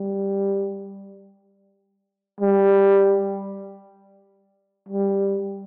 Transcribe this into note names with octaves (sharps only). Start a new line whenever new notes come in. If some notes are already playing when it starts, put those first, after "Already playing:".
Already playing: G3
G3
G3